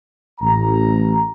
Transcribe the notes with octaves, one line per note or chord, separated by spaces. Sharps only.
A1 A#5